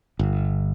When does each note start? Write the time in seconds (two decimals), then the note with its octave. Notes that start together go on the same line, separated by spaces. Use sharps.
0.19 G1